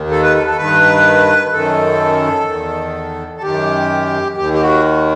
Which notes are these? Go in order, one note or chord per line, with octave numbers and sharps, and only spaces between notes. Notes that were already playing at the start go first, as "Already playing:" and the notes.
Already playing: D#2 D#3
A4
B4
A4
A4
G2 D#3 B4
F#2 D#3 A4
E2 D#3
A4
F#2 D#3 G4
D#2 D#3 G4
G4
F#4